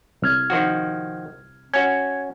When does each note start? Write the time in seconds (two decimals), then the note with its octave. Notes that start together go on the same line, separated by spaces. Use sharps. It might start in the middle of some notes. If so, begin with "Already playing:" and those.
0.22 C2 F6 G#6
0.50 D#3 F3 F#4
1.74 C#4 F#4 G#6